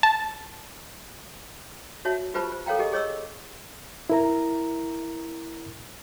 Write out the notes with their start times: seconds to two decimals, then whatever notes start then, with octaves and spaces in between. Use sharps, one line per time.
0.03 A5
2.05 F#4 C#5 E5 A5
2.34 F4 G4 B4 C5 A5 B5
2.52 C5
2.66 A4 A#4 C#5 F5 G5 A#5
2.79 G4 G#4 A#4 D#5
2.93 G#4 C#5 D#5 C#6 E6
4.10 E4 A#4 A#5